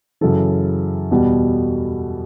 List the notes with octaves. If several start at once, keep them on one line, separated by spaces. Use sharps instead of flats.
F#2 C#3 E3 A4
E2 B2 G3